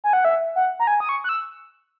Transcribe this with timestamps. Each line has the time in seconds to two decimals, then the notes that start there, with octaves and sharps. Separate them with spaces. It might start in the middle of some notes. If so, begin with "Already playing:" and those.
0.04 G#5
0.13 F#5
0.25 E5
0.56 F#5
0.80 A#5
0.87 G#5
1.00 D#6
1.09 C#6
1.24 F#6
1.29 E6